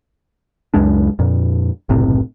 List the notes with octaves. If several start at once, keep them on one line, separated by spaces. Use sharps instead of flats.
C#2 F#2 G#3 D4
F2 A#2
F#1 B1 A2 C3